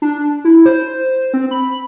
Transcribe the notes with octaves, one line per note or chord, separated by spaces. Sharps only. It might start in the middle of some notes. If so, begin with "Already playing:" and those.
D4
E4
C5
C4
B5